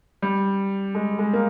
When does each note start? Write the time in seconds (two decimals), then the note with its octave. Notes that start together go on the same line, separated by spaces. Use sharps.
0.22 G3
0.95 G#3
1.19 G#3
1.33 A#3